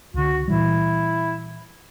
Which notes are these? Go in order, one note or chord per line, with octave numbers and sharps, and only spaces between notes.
C#2 D3 F#4
A#2 E3 G3 E4